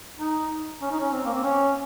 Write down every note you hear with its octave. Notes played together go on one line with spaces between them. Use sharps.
D#4
C#4
D#4
C#4
C4
A#3
C4
C#4